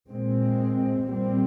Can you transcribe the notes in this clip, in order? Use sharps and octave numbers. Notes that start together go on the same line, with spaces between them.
A#2 G#3 C4
A#2 G3 C4